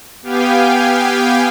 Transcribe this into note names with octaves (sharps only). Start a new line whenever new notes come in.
B3 G4 F5 G5 G#5